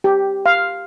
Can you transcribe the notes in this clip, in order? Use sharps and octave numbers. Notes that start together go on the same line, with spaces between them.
G4
F5